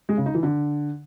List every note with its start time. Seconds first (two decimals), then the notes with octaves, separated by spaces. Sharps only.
0.09 G#3
0.17 C#3
0.26 D#4
0.34 E3
0.43 D3